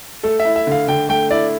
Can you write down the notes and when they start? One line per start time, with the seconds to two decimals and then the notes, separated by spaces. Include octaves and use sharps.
0.24 A3 A4
0.40 E5
0.45 E4
0.56 E5
0.67 D3 F5
0.88 D3 G5
1.09 A3 G5
1.31 E4 D5